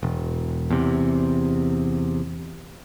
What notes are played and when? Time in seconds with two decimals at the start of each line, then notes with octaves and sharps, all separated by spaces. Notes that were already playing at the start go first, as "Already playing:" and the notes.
0.03 E1
0.70 E2 C3